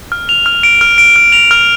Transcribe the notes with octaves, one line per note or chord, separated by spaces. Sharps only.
F6
F7
F6
D7
F6
D7
F6
F7
F6